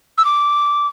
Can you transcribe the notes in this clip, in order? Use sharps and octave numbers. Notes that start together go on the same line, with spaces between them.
E6
D6